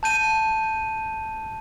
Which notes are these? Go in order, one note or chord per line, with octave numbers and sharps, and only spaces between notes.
A5 G6 D#7